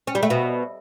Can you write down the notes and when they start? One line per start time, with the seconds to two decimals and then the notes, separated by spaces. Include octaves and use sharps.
0.07 C#4
0.15 G3
0.23 A3
0.30 B2